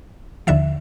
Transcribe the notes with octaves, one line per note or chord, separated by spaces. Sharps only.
D#2 D3 F3 E5